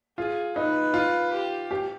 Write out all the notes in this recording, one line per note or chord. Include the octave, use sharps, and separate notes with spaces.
F4 G#4
D#4 B4
F4
G4
G4